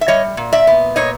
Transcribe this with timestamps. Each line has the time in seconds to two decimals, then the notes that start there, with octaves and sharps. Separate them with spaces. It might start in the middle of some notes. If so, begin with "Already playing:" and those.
0.01 E5
0.08 G3 C#5 D#5
0.37 A#2
0.52 D5 E5
0.67 B3
0.96 A#2 C#5 D#5